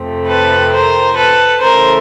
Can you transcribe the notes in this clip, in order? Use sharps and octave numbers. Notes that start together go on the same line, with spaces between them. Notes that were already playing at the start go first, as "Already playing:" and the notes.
Already playing: F2 C3 F3 A3 C4
A4 B4
A#4 C5
A4 B4
C#3 E3 A3 A#4 C5